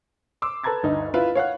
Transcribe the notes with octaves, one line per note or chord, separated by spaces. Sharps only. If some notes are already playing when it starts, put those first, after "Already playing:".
C6 D6 E6
A4 B4 A5 A#5 G#6 A6
G1 D2 D#4
E4 F4 B4 E5
C#5 F5 F#5 F#6